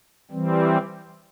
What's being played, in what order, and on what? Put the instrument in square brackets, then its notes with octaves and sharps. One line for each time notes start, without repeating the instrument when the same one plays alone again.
[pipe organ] E3 G3 C4